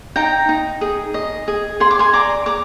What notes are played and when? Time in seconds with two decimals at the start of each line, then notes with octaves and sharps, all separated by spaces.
0.16 D#4 G5 A#5
0.49 D#4
0.81 G#4
1.14 D#5
1.48 G#4
1.80 G#4 C6
1.91 D6
1.99 G#5 C6
2.13 D5 A#5 D6
2.46 G#4 A#5 D6